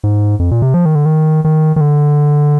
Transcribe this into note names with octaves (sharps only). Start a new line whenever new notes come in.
G#2
F2
A#2
C3
F3
D#3
D3
D#3
D#3
D#3
D3